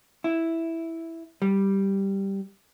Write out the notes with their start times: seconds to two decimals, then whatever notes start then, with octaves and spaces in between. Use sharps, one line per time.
0.24 E4
1.42 G3